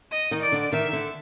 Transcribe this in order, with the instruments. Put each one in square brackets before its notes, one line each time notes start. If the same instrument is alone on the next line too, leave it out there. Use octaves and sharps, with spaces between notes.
[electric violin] D#5
[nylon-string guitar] D#3
[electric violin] D5
[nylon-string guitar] D3
[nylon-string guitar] D#3 [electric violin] E5
[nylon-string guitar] D3